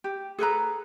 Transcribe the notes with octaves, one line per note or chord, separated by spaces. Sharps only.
G4
G#4 A4 B4 A#5